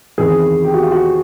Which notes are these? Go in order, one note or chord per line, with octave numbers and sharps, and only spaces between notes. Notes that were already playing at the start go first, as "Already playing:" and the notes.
E2 C3 D#3 G#4
G4
F#4
F4
F#4